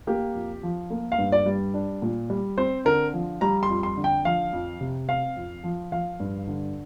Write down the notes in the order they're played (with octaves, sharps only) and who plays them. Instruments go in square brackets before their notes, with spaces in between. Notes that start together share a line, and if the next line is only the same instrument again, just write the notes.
[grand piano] A#3 G4
F2
F3
A#3
F5
G2
D5
G3
D4
A#2
G3
C4 C5
D3 A#4
F3
G3 A#5
C6
F2
C6
D3
G5
F3 F5
F2
C3
C4 F5
F2
F3
F3 F5
G2
D3